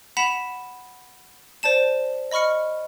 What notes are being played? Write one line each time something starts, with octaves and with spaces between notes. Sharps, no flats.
F#5 B5 B6 E7 F7
C5 D5 A5 E7
D#5 B5 C#6 F6 C#7